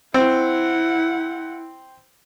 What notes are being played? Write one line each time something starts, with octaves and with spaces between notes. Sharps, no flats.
C4 E4 F#5